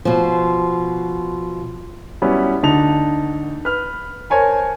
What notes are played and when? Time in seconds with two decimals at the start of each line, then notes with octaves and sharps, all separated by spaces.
0.05 B2 F3
2.22 F#3 G3 B3 C#4 E4
2.63 D2 D3 D#4 A5 F7
3.65 B4 F6
4.30 A#4 C5 C#5 G#5 A5